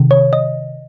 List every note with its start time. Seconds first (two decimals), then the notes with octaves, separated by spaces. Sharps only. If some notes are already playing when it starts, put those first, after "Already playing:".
Already playing: C3 D#3
0.11 C#5
0.33 D#5